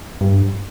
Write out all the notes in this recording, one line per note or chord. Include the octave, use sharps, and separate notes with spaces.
G2